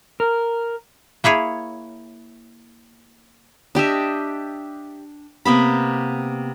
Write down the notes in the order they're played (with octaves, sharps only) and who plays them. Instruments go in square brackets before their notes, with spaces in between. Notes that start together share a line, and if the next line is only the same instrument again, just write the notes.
[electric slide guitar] A#4
[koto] A#3 E4 G#4 C#5
[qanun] D4 G4 D#5 E5
C3 A#3 B3 B5